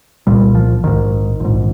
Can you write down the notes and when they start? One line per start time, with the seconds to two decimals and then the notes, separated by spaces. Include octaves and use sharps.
0.27 C2 A#2 G3
0.55 F3
0.83 A#1 G#2 D#3
1.40 A#1 G#2